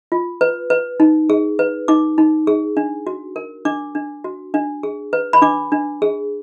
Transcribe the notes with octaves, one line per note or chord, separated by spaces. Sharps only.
F4
B4
B4
D#4
G#4
B4
D#4 D6
D#4
G#4
D4
F#4
A#4
D4 D6
D4
F#4
D4
G#4
B4
B5
D4 D6
D4
G#4